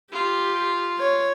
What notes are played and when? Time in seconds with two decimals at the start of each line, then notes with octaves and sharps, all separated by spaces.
0.12 F4 G4
0.99 C#5